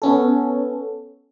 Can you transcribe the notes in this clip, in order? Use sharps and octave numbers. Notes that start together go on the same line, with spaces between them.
B3 C#4 A4